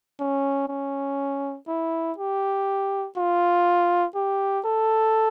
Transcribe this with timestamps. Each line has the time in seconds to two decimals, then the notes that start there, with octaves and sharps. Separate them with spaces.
0.20 C#4
0.68 C#4
1.68 E4
2.18 G4
3.17 F4
4.15 G4
4.65 A4